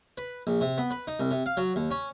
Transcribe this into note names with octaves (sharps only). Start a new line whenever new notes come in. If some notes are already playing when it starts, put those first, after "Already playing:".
B4
A#1
C3
B3
B4
D#4
C2
C3
F5
F#3
D#2
C#4